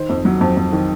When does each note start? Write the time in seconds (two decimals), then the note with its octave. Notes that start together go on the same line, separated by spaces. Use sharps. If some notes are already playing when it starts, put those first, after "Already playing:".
Already playing: D#3 C5
0.09 F2
0.25 F#3
0.41 F2
0.56 F2
0.72 D#3